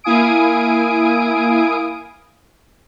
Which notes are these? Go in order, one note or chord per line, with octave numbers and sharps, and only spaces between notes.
A#3 E4 F5 G#5 D#6 D7